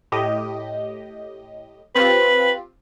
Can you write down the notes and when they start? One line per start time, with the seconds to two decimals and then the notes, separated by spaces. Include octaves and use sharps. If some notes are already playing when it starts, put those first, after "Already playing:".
0.12 A2 G4 D#5
1.95 C4 F4 G4 B4